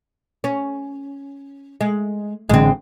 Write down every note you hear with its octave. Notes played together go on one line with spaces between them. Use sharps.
C#4
G#3
A1 D3 G#3 C4